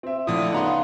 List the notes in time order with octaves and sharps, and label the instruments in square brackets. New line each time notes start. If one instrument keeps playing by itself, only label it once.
[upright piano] C4 E5
[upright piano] A2 [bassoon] D3 [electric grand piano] F3 E4 [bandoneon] D#6
[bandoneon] C#3 B3 [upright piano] D#4 [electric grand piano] F#5 A#5 C6